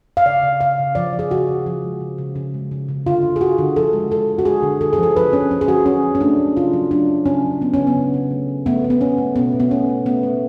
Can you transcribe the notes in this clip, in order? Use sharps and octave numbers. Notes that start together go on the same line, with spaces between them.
F5
C#3 D5
C#3
C#3 F5
C#3
F3 D5
F3
G#4
C#3 F#4
C#3
F3
G#3
C#3
C#3
C#3
G#3
C#3
C#3
D3 F4
D3
G#4
D3 F#4
D3
F3 A4
G#3
G#3 A4
G#3
F#4
G#3 G#4
D3
D3 A4
G#4
F3 A4
D3 B4
D3 C#4
F3 C#4
G#4
D3 F#4
F#3 C#4
F#3
C#4
A3 D4
A3
C#3 F4
F#3
A3 D4
A3
C#3 C#4
F#3
F#3 B3
C#3 C#4
B3
C#3
C#3
A3
F#3
A3 B3
A3
B3
A3 C#4
A3
B2 B3
B2
B3
A3 C#4
A3
A3 B3
A3